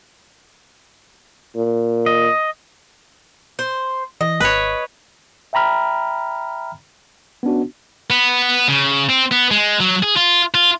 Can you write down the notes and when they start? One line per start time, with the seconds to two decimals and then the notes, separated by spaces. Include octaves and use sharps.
1.56 A#2
2.06 D#5
3.59 C5
4.21 E3 D#5
4.40 G#1 B4 C#5
5.53 E5 G5 A#5 B5 F6
7.43 B3 C#4 D4 F#4
8.10 B3
8.68 C#3
9.09 C4
9.31 B3
9.51 G#3
9.80 F#3
10.03 G#4
10.16 F4
10.54 F4